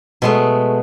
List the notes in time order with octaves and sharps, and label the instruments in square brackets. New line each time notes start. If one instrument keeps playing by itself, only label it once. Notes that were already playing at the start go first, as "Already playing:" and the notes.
[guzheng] B2 G#3 A3